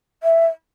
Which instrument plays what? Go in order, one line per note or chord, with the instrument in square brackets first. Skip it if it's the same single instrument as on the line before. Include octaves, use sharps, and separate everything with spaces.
[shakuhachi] E5